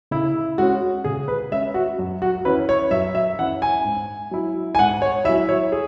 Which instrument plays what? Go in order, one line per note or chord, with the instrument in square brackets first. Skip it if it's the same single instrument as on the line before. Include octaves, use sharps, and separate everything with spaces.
[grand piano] C#3 E4
G#3 C#4 F#4
C#3 G#4
B4
G#3 C#4 E5
F#4
F#2
F#4
E3 C#4 E4 B4
C#5
F#2 E5
E5
E3 C#4 E4 F#5
G#5
G#2
F#3 E4
G#5
G#2 F#5
C#5
E4 E5
F#3
C#5
G#4